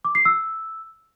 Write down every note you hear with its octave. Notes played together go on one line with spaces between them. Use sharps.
D6
C7
E6